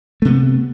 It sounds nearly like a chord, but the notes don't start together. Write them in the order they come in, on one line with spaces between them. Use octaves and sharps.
A3 C3 B3